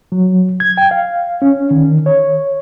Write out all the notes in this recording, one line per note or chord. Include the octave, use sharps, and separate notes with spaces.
F#3
G#6
G5
F5
C#4
D#3
C#5